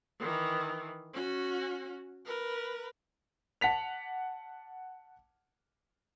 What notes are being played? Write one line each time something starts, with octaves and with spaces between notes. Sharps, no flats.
D#3 E3
C#4 F#4
A#4 B4
F#5 A5 B6 F7